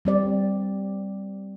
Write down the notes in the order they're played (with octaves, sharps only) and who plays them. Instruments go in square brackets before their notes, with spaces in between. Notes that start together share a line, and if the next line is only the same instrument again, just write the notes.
[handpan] G3 C4 D5